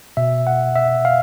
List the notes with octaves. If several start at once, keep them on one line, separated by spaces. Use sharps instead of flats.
B2 E5
F#5
E5
F5